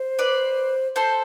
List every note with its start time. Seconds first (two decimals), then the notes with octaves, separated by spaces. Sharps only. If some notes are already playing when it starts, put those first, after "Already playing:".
Already playing: C5
0.19 B4 D5
0.96 A4 C5